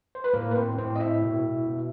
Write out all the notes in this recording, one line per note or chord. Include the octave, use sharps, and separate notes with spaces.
C5
B4
A2 A#3 A#4
B4
C4 C5
A2 C4 C5
D#5
E4 E5
B2
B2